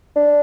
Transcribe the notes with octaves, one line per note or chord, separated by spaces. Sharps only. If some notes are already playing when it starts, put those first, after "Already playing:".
D4